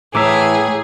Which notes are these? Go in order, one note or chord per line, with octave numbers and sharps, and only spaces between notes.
A2 E3 A3 G#4 E5 A#5 D6